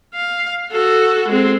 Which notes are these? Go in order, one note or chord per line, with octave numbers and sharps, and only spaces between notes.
F5
F#4 A4
G#3 C4